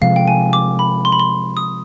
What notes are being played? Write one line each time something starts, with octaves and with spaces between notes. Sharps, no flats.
C3 F3 G#3 F5
G5
G#5
D6
B5
C6
B5
C6
D#6